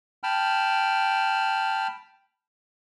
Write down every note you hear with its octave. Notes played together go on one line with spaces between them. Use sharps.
G5 A5 B5 F6